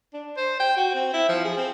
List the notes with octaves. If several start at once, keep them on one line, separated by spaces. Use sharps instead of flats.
D4
C5
G5
F#4
C4
E4
F3
G#4
C4